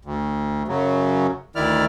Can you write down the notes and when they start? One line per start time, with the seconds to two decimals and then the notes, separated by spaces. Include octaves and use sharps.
0.05 D2
0.68 F#2 C#3 F#3
1.56 D2 D#3 E4 D5 F6